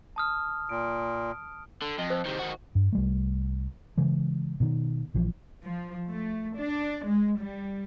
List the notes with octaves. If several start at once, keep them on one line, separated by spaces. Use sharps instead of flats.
A5 D#6 F6
A#2 D7
D3
F2 D#5
C5
C3 D#3
D#3 F#4
G2
C2 G3 A3
C#3 E3 G#3
B2 D#3
A#1 E3 F3
F3
A3
D4
G#3
G3